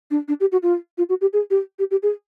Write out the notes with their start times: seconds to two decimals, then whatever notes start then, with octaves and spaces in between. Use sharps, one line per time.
0.11 D4
0.28 D4
0.40 G4
0.52 F#4
0.63 F4
0.98 F4
1.09 F#4
1.21 G4
1.33 G#4
1.50 G4
1.79 G4
1.91 G4
2.03 G#4